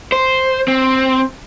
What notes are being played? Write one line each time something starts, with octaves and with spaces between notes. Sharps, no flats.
C5
C4